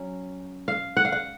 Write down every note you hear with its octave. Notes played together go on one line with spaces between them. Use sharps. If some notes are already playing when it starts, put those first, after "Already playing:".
Already playing: F#3 C#4
F5
F#5
F5
F#5